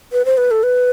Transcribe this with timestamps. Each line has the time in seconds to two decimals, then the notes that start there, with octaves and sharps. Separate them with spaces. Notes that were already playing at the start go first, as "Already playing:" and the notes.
0.13 B4
0.25 C5
0.37 B4
0.51 A4
0.63 B4